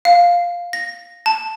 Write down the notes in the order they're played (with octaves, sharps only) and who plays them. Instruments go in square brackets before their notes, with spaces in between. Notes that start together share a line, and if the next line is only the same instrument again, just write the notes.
[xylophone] F5
A#6
A5